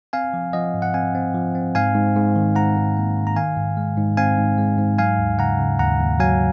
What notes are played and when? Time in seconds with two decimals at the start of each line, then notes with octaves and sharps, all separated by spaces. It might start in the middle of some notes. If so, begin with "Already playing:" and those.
0.13 C4 F5 G#5
0.33 F3
0.53 F3 D#5 F#5
0.74 G#2
0.82 F#5
0.94 C4 F5 G#5
1.15 C4
1.34 F3
1.55 C4
1.75 G#2 F5 G#5
1.95 G#2
2.16 G#2
2.36 D#3
2.55 G#2 F#5 A#5
2.76 G#2
2.97 A#3
3.17 D#3
3.27 A#5
3.36 D#3 F5 G#5
3.57 G#2
3.77 G#3
3.97 G#2
4.17 C4 F5 G#5
4.38 G#2
4.58 G#3
4.78 G#2
4.98 F#3 F5 G#5
5.19 D#2
5.39 C#3 F#5 A#5
5.59 C#3
5.79 D#2 F#5 A#5
6.00 D#2
6.20 F#3 F5 G#5